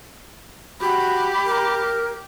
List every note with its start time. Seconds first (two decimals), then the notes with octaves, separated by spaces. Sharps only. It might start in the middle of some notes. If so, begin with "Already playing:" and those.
0.81 F#4 G4 B5
1.46 A#4